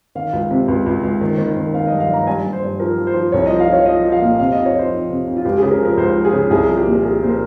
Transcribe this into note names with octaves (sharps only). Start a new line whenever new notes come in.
D#3 F5
C#2
C3
C#2
C#2
C#2
D#3
D#3
D#3
D#3 F5
D#5
G2
F5
G2 A#5
G2 G#5
G2
C5
G2
F3 A#4
F3
C5
F3
C2 C#5
D#5
F3
F5
F3 C#5
F3 D#5
F3
F5
A#2
C3 F5
F2 D#5
C#5
F3 C5
F2
C3
F2
F4
C#2 G4
G#4
C#3
A#4
F3
A#4
C#2 C5
F3
G#4
C#3
C2 G#4
F3
G4
A#2
A#4
F3 G#4
A#2 C5
A#4